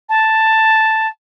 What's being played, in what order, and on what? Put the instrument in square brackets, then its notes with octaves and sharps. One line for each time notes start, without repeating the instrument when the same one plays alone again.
[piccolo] A5